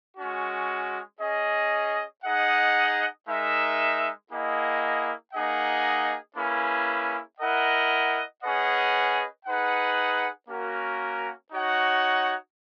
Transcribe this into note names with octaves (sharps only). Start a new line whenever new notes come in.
G#3 C#4 F#4
C#4 G#4 D#5
D#4 G#4 D#5 F#5
G#3 D#4 A#4 E5
A#3 E4 G#4 D#5 F#5
A#3 D#4 G#4 D#5 F#5
A#3 C#4 E4 G#4 B4
E4 A#4 D#5 F#5
C#4 G#4 B4 D#5 F#5
D#4 G#4 B4 F#5
A#3 C#4 F#4 A#4
D#4 F#4 C#5 F#5